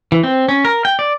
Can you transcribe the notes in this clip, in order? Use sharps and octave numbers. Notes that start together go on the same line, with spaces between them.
E3
C4
C#4
A#4
G5
D5